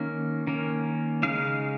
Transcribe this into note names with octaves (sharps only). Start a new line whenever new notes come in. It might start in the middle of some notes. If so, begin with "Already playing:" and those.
Already playing: D#3 A#3 C#4
D#3 A#3 C#4
C#3 F3 G#3 D#4 F5